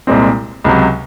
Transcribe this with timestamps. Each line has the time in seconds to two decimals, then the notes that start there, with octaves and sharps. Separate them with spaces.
0.07 C2 A#2 G#3 C4
0.64 C#2 C3 F#3